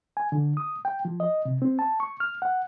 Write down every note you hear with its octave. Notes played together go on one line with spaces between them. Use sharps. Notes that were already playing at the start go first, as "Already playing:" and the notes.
G#5
D3
D#6
G5
F3
D#5
C3
C4
A5
C#6
F6
F#5